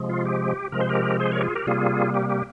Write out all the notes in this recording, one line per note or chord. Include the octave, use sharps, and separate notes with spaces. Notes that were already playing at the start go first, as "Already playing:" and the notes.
Already playing: C3 F3 G#3
F4
G4
C3 F3 G#3 A#4
C5
G4 A#4
G#4 C5
A#4 C#5
G4
F4 G#4
G4 A#4
C3 G3 A#3 F4 G#4
G4
G4